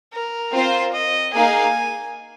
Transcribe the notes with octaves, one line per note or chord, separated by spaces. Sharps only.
A#4
C4 F4 C5
D#5
A#3 D#4 G#4 F5 G#5